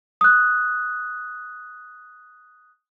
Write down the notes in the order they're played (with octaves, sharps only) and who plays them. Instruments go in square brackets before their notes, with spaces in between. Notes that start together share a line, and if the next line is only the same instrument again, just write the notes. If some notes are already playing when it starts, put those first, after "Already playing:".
[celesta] D#6 F#6